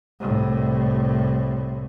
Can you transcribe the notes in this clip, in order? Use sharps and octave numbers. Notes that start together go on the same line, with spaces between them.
C2 A2